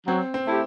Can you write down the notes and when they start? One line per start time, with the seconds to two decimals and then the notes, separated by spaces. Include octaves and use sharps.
0.07 F#3 C4
0.34 C4
0.47 A3 E4 G4